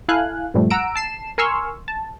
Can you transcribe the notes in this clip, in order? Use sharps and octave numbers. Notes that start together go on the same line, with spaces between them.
E4 A4 F5 G#5 F#6
G2 A#2 F3 G3 A3
F#5 A#5 E6 D7
A5 C7 E7
A#4 G#5 C6 C#6 E6 F6
A5